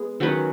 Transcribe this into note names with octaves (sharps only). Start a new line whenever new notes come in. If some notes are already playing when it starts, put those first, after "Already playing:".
Already playing: G#3 B3 G#4
D#3 F#3 C#4 B4